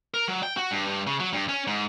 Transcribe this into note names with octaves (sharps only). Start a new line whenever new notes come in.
A#4
F#3
G5
F#4
G2
G2
C#3
F#3
G2
C#4
G#2